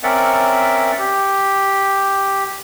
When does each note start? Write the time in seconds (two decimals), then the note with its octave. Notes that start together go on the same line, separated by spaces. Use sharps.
0.03 C4 C#4 A#4 D5 E5 F#5
0.99 G4